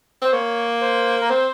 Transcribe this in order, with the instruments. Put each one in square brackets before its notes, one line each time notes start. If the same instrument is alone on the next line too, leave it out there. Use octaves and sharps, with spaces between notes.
[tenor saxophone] C4 [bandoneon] C5
[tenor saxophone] A#3 [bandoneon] C#5
[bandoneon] C5
A#4
[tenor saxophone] C4 [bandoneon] C5